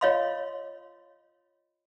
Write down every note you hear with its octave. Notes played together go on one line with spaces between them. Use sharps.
F4 C#5 D#5 F5 B5 C6